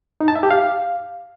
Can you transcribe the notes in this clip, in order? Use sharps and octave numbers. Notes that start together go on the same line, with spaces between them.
D#4
A5
E5
G4
F5